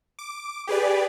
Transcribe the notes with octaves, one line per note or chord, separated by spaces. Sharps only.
D6
G4 G#4 B4 D5